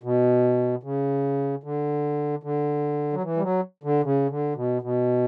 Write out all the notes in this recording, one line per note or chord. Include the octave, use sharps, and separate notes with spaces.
B2
C#3
D3
D3
F#3
E3
G3
F#3
D3
C#3
D3
B2
B2